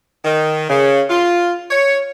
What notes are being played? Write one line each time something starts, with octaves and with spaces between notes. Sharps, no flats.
D#3
C#3
F4
C#5